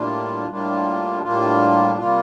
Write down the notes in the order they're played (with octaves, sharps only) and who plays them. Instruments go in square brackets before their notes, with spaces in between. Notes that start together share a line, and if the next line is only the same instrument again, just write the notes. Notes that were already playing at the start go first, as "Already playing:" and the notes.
Already playing: [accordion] A2 G3 A#3 D4 F4
A2 G3 A#3 D4 F4
A2 G3 A#3 D4 F4
C3 G3 A#3 F4